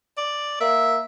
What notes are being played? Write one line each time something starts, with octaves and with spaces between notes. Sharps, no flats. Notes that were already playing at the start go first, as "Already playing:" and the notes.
D5
A#3 E5